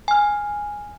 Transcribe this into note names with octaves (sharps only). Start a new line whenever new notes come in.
G#5 F6